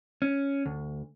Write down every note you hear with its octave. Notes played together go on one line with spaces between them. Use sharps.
C#4
D2